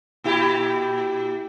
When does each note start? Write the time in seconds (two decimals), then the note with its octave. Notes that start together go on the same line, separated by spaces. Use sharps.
0.24 A#2 E4 G4